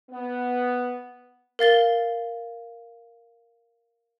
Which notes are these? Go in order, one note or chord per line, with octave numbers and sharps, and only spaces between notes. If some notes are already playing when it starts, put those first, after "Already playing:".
B3
A#4 F5 A6 G7